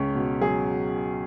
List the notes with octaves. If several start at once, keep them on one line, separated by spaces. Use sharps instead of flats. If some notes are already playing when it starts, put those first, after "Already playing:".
Already playing: C#2 C#4
B2
F#3 G#4